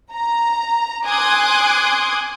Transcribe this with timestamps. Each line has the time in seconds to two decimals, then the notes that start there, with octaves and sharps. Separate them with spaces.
0.13 A#5
1.06 G#5 C6 D6 D#6 F#6 G#6